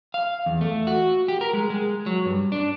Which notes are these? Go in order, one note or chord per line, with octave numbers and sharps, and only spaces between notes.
F5
E2
A3
F#4
G4
A#4
G#3
G#3
F#3
G2
D4